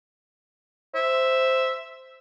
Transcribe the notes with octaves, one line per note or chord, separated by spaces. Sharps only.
C5 E5